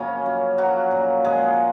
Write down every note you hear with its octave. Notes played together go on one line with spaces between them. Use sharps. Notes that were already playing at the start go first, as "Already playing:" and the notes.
Already playing: F#2 C#3 F3 A#3 C#4
F#2
F3 F#3 F#4
A#2
F3 G#3 G#4